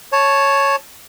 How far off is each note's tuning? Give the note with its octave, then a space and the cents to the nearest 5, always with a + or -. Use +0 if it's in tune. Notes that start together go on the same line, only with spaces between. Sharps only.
C#5 +0 A5 -10